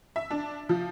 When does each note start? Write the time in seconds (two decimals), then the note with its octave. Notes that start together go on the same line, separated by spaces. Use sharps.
0.16 E5
0.31 D4
0.69 F3